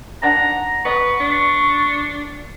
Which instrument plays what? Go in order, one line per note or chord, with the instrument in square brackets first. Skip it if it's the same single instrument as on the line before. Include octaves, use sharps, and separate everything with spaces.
[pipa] D#3 D4 F#5 [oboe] A#5
[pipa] B3 D#5 [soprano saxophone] B4 [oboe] C#6
[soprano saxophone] D4